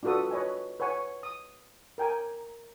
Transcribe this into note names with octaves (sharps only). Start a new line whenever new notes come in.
D4 F4 F#4 A4 B4 D#6
B4 C#5 D#5 G#5
B4 C#5 F#5 G#5 C#6
D#6
A#4 G5 G#5